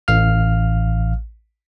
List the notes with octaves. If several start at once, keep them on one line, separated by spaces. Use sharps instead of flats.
A1 F5 F6